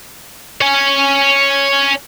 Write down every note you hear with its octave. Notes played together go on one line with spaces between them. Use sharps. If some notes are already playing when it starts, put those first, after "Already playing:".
C#5 G#5